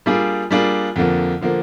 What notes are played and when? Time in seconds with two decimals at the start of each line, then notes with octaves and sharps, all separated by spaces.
0.06 G3 A#3 D4 F4 G#4
0.51 G3 A#3 D4 F4 G#4
0.96 F2 D3 F3 A#3
1.41 D3 F3 A#3